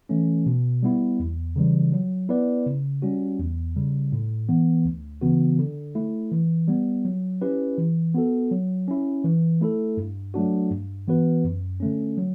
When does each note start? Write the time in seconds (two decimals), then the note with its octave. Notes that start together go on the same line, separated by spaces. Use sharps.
0.09 E3 A3 C#4
0.46 B2
0.83 G3 B3 E4
1.20 E2
1.56 C#3 E3 G3
1.93 F#3
2.29 B3 E4 B4 D5
2.66 C#3
3.02 G3 C#4 F#4
3.39 E2
3.76 C#3 G3
4.12 A2
4.49 E3 B3
4.85 D2
5.22 C#3 E3 B3 F#4
5.59 D3
5.95 A3 E4
6.31 E3
6.68 G3 B3
7.05 F#3
7.42 C#4 E4 G4 B4
7.78 E3
8.14 B3 F#4 A4
8.51 F#3
8.88 C#4 E4
9.24 E3
9.61 A3 E4 A4
9.97 G2
10.34 F#3 A3 D4 F#4
10.71 G2
11.08 E3 B3 F#4 B4
11.44 F#2
11.80 D3 A3 C#4
12.17 F#3